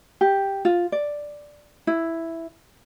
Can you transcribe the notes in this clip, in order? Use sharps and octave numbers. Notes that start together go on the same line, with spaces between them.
G4
F4
D5
E4